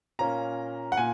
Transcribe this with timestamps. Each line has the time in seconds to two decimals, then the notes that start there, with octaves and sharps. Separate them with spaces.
0.19 A#2 A#3 C#4 A#5
0.92 F#5
0.97 A#2 G#5